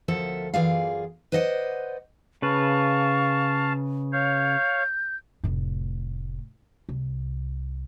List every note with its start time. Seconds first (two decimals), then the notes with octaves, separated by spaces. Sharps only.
0.08 D2 F3 A4 A#4 E5 F#5
0.54 F#2 E3 F4 G#4 D5 F5
1.32 B4 C5 D5 D#5 F5 F#5
2.42 C#3 B4 F5 A5 C#6
4.13 C#5 F5 G6
5.44 F1 A2
6.89 C2